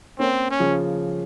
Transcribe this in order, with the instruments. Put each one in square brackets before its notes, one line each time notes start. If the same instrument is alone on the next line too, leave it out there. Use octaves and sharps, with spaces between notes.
[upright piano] A#3 C#4 [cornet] C4
[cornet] C#4
[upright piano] C#3 F3